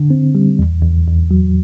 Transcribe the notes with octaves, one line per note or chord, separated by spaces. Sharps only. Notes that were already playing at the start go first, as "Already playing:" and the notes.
Already playing: D3
C4
G3
E2
E2
E2
F#3